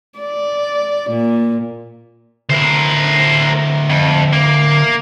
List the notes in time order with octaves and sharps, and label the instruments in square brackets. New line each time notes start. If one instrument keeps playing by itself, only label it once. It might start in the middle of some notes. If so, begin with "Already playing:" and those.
[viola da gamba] D5
A#2
[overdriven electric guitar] D2 E4 [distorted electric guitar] A#4 C5
[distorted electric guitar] F2
A#3